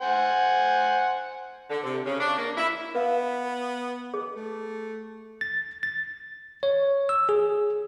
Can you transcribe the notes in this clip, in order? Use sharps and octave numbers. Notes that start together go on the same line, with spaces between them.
C5 F#5 G#5
D3
C3
C#3
D4
A#3
E4
B3 B4 F5
G#4
A3
A6
A6
C#5
E6
G#4